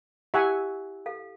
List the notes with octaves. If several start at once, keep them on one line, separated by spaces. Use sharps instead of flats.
E4 G4 E5 F#5 G#5
A4 F5